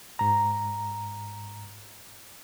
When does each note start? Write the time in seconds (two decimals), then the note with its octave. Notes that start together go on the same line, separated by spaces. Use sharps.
0.19 G#2 A#5